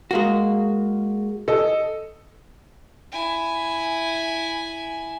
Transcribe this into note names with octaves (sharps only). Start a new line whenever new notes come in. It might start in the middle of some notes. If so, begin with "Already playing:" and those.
G#3 A#3 F#4
A4 D#5
E4 G#5